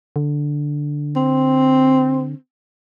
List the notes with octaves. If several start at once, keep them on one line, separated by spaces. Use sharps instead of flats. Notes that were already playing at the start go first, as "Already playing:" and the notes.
D3
C4